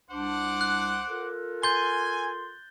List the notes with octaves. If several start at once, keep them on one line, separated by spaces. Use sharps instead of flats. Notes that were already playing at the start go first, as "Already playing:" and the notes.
C2 D4 C5 F#5 D6
F#6
F4 A4 A#4
G#5 C6 G6 A6 G7